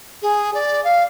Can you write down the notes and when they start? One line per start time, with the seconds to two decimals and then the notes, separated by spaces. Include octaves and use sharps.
0.22 G#4
0.54 D5
0.84 F5